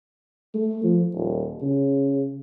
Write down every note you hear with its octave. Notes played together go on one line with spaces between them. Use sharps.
A3
F3
D#1
C#3